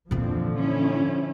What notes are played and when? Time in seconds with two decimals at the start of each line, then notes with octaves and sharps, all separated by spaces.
0.11 F2 A#2 D3 E3 F3 C4
0.55 C#4 E4